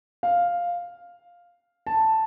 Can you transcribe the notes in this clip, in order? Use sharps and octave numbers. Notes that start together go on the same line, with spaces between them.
F5
A5